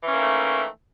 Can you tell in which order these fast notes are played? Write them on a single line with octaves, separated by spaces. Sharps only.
E3 C#4 A#3 D#3 A3